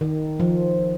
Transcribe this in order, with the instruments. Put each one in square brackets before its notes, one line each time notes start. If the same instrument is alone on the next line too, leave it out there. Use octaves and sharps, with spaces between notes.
[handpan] D#3
F3